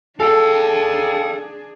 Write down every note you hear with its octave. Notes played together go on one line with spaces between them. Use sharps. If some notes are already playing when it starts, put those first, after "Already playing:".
D4 G#4 A4 F5 G5